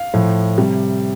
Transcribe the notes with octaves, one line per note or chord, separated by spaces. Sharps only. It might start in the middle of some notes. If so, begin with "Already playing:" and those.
Already playing: F5
A2 F3
C3 G3